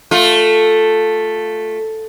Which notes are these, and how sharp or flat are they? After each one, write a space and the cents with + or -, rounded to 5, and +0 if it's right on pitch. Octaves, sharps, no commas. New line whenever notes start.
A3 +0 F4 +15